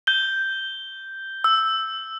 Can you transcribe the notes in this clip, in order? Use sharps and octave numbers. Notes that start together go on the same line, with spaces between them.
G6 G7
E6